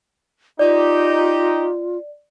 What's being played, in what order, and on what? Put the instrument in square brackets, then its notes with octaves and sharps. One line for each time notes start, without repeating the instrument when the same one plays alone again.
[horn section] D#4 G4 [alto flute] F4 [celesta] D5